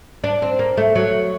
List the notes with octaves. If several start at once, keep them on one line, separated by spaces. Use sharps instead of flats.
D4
C4
A#3
A3
F#3